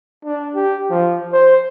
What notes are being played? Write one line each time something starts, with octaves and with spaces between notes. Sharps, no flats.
D4
G4
F3
C5